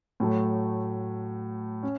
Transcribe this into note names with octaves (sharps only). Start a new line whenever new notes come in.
A2 F#3 A3
C#4